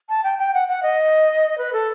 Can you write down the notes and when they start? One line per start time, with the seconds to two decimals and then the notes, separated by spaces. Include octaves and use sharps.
0.09 A5
0.24 G5
0.39 G5
0.54 F#5
0.68 F#5
0.83 D#5
1.58 B4
1.73 A4